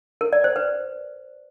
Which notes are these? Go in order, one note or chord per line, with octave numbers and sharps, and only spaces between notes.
A#4
D5
C5
B4